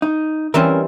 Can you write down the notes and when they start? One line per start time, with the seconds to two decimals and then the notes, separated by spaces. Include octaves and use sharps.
0.02 D#4
0.54 E3 G3 C4 C#4 A#4